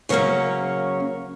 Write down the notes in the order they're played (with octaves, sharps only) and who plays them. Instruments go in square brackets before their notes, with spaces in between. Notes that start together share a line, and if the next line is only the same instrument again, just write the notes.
[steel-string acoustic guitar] C#3 F#3 A#3 C#4 C#5